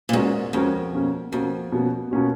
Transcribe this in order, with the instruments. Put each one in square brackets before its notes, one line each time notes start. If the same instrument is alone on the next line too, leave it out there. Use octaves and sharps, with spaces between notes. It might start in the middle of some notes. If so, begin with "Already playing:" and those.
[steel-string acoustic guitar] A#2
[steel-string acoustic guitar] G#2 [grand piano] G#3 C#4 F#4 A#4
[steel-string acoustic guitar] F2 [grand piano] G#3 C#4 F#4 A#4
[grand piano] B2 A#3 C#4 F#4
[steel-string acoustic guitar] F2 [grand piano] B2 A#3 C#4 F#4
[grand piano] B2 A#3 C#4 F#4
B2 A#3 C#4 F#4